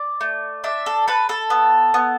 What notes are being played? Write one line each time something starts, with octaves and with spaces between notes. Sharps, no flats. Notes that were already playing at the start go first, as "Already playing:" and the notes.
Already playing: D5
A3
D4 E5
A4
A4 B4
A4
B3
B3